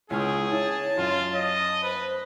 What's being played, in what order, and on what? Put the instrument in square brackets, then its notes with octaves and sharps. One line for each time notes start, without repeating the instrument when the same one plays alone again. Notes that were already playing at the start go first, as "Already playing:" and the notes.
[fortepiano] C#2 G#5 F6 [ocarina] E4 [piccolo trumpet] G#4 [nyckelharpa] C#5 G5
[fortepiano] E4 [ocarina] C#5 [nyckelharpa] A5
[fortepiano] F#2 F5 [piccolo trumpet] F4
[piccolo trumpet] D#5
[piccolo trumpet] B4 [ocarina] C5 [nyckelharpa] B5